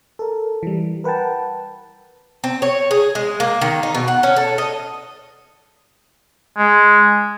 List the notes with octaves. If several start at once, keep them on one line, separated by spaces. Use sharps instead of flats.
A4 A#4
E3 G3
A#4 B4 F#5 G5 A5
C4
C#5
G#4
G#3
A#3
D#3
D#4
B2
F#5
C#4
A4
D#5
G#3